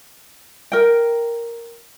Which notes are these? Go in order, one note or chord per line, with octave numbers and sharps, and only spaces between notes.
A#4 G5